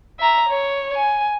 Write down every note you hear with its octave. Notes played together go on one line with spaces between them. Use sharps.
E5 A#5
C#5
G#5